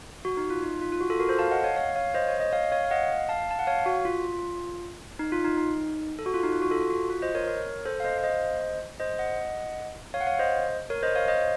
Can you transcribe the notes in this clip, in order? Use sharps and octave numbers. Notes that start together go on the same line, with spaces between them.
F#4
D#4
F4
D#4
F4
F4
F#4
F4 A4
F#4 A#4
A4 C5
F5 A5
D#5 F#5
C#5 F5
C#5 F5
C#5 F5
C5 D#5
C#5
D#5
C#5 F5
C#5 F5
F5
D#5 F#5
F5 A5
A5
F#5
C#5 F5
F#4
F4
D#4
F4
D#4
D#4
A4
F#4
F4
D#4
F4
F#4
F4 A4
F#4
F4
C5 D#5
A#4 C#5
A#4 C#5
A4 C5
F5
C5 D#5
F5
C5 D#5
C5 D#5
D#5 F#5
C#5 F5
F#5
C#5 F5
C5 D#5
A#4 C#5
C5 D#5
C#5 F5
C5 D#5